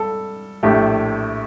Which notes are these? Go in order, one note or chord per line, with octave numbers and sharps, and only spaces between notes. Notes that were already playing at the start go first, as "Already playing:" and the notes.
Already playing: G3 A4
A#1 A2 A3 G4